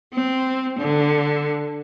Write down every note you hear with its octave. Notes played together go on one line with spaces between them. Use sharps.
C4
D3